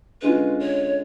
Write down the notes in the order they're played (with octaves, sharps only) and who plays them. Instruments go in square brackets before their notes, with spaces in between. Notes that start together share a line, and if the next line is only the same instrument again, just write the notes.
[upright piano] D3 G#3 C#4 F4 [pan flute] B4
[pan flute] C#5